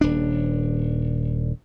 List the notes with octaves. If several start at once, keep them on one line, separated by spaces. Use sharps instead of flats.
D#1 D4